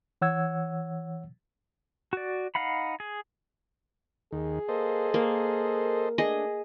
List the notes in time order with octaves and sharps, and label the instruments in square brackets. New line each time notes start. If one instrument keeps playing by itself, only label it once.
[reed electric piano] E3 C#5 F#5 E6 G#6
[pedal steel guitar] F#4 D5
D#4 F5 F#5 B5
G#4
[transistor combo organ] D#2 D#3 [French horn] G#4
[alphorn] A#3 [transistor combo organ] A4 C5 D#5
[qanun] A#3 [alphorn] A#4
[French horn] A3 [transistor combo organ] D4 [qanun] G#4 D#5